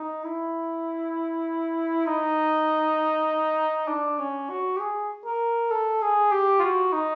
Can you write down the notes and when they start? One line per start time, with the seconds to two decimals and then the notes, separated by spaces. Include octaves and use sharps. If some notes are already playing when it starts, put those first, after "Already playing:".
Already playing: D#4
0.24 E4
2.07 D#4
3.88 D4
4.19 C#4
4.50 F#4
4.76 G4
4.81 G#4
5.25 A#4
5.71 A4
6.02 G#4
6.32 G4
6.59 F4
6.62 F#4
6.93 D#4